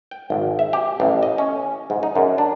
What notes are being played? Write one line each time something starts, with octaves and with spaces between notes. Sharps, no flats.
G5
G#1
E5
G4
A1
D#5
C#4
G#2
D#4
F#2
D4